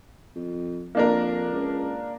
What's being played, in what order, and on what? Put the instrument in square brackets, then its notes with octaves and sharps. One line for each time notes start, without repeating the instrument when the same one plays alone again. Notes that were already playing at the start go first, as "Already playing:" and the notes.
[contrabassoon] F2
[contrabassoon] F2 [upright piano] A#3 D4 A#4
[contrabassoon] C#2